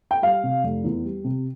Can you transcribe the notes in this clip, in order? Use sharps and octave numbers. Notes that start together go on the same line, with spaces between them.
G5
G3 F5
C3
F1
E2
G3
C3